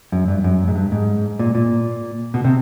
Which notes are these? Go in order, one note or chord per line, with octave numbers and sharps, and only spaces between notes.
F#2
G2
F#2
G#2
G2
G#2
A#2
A#2
B2
C3